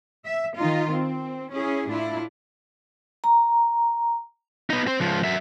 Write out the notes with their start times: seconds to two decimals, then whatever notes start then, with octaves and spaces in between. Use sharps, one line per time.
0.25 E5
0.56 D#3 D#4 F4
0.91 C4
1.51 C#4 E4 G#4
1.89 A2 D4 E4 F4
3.24 A#5
4.70 B3 D#4
4.87 C4 C5
5.00 C#2 F3
5.24 F#3 E5